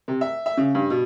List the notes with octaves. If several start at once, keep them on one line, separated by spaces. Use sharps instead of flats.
C3
E5
E5
C#3
G2
B2